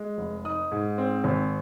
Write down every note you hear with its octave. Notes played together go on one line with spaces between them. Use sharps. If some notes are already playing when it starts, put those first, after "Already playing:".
Already playing: G#3
F1
D#4 D#6
G#2
C4
G#1